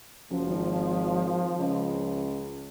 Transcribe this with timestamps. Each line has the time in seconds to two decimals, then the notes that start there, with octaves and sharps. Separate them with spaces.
0.30 F#1 F3
0.47 G#1
1.59 C#2